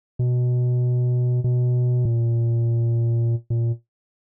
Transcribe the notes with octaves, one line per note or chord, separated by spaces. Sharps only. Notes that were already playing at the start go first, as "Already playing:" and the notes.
B2
B2
A#2
A#2